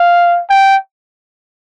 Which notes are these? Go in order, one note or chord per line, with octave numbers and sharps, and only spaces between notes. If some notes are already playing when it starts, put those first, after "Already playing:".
Already playing: F5
G5